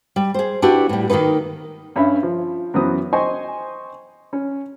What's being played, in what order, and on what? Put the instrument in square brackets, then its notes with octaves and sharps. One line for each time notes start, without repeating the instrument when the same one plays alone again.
[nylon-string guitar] G3
G#4 C5
D4 E4 F#4 G4 B4
A2 G3
D#3 A#3 C#4 D#4 B4
[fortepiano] G2 C#4 E5 B5
F3
F#2 E3 F#3 B3 C5 D#6
C5 D#5 G5 G#5 C6 C#6
C#4